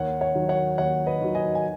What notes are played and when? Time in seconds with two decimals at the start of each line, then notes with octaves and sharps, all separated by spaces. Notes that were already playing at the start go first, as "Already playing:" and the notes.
Already playing: D#2 C#5 F#5
0.21 C#5 F#5
0.35 D#3 F#3
0.49 C#5 F#5
0.78 D#2 C#5 F#5
1.06 B4 D#5
1.21 D#3 F#3
1.35 D#5 G#5
1.55 G#5